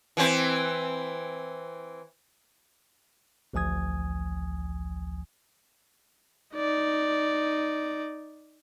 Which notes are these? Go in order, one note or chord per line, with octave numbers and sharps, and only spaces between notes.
E3 C4
A1 D2 F3 G#5 D#6 G#6
D#4 D5